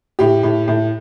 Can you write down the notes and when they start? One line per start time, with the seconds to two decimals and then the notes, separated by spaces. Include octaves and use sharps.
0.19 A2 G4
0.43 A2
0.68 A2